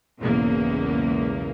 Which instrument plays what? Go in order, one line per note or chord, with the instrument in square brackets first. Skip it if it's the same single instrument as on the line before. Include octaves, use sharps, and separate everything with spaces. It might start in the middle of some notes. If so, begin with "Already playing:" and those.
[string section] B1 E2 G#2 C#3 A#3